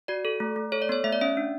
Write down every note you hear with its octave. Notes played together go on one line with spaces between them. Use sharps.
F#4 D5
A4
A3
A3
A4 C#5
D5
B3 C#5
A3 E5
D5
C#4 E5
D4